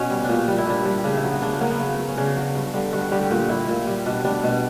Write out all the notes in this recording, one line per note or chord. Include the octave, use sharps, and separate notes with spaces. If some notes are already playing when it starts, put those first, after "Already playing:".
Already playing: B2 B3 C#4
G3
A#2 C#4 D4
G3 D4
E4
A#2 D4
G3
C#3 D4
E4
F#3
B3
C#3 D4
C#4
F#3 A#3
B3
C#3
F#3
C#4
C#3 D4
F#3
G2
D3 G3
G2 F#4
D3 G3 G4
G4
A#2 F#4
G3 E4
A#2
G3
B2 D4
G3 D4
B2